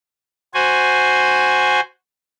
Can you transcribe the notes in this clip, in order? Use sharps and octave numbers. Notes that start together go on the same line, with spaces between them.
F#4 C5 G#5